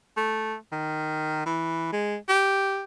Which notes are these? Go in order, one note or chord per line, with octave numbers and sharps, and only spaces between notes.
A3
D#3
E3
G#3
G4